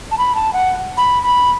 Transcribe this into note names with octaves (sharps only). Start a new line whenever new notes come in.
A5
B5
A5
F#5
B5
B5